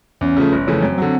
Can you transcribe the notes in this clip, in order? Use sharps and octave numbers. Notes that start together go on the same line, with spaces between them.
E2 C#4
C#3 F3 A3
G1
F2 C#3 E3 A3
F#2 C4
D3 F#3